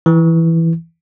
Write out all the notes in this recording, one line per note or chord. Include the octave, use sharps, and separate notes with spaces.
E3